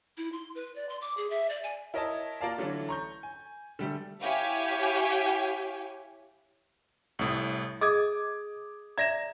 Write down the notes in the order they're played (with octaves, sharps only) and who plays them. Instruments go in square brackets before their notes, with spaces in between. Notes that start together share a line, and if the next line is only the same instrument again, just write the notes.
[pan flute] E4
C6
B4
D5
C6
D6
G#4
E5
D5
G#5
[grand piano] E4 A#4 C#5 D#5 E5 A5
A#3 F4 A#4 D5 F5 A5
D3 E3 F#3 A3 C#4 D4
A#5 C#6 G6
G#5
D3 G3 A3
[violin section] E4 G4 C#5 F5 G5 G#5
[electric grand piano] C2 A2
[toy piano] G#4 D#5 [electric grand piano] D6 D#6 G#6
[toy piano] D5 E5 A#5 [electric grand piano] G#6 A#6 E7